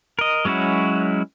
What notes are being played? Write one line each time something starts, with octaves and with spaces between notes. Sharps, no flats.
A#4 D#5
F#3 G#3 C#4 E4 F#4